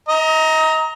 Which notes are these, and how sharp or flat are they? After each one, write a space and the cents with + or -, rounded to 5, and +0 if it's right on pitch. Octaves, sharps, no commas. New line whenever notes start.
D#5 +35 A#5 +0